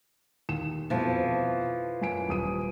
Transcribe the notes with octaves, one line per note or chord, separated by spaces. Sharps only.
D#2 E7
F2 B2 E3 F3
F#2 G#5 D7
D#1 D#6 D#7